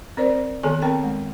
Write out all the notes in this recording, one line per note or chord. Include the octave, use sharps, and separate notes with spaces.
C4 A#4 C5 D5
D#3 B3 G#4 A4 G#5
C4 A#4 G5 A5
G#3